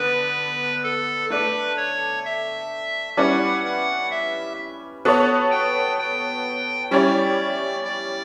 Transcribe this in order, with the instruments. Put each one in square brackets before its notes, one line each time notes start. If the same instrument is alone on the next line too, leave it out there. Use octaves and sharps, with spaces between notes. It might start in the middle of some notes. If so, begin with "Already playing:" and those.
Already playing: [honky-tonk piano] D3 B3 [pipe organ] B4
[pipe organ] A4
[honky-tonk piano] A3 D4 A4 [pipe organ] B4
[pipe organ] C#5
E5
[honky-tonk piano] G3 C#4 E4 B4 D5 [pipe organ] F#5
[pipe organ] F#5
E5
[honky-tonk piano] B3 F#4 A4 C#5
[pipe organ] G5
G5
[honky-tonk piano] G3 C#4 E4 G4 C#5 [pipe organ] D5
[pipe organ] D5